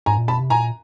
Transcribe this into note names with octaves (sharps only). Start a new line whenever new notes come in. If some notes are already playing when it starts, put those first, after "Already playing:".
G#2 G#5 A#5
A#2
B2 A5 B5
C3
A#2 G#5 A#5